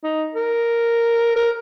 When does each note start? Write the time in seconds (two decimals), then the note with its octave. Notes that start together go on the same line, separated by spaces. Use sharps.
0.04 D#4
0.34 A#4
1.36 A#4